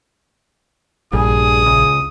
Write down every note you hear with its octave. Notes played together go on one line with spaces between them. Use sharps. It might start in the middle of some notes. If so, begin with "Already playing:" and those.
A#1 G2 G#4 D#6
C#2